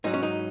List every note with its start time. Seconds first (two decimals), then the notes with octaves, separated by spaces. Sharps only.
0.04 G#2 F#3 D#4
0.14 C#4
0.23 D#4